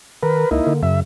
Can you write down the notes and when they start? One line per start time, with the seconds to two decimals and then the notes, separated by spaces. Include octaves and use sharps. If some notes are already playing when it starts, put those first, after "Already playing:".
0.23 D#3 A#4 B4
0.51 C#2 A#3 D#4 E4
0.67 D3 A#3
0.83 F#2 C#3 E5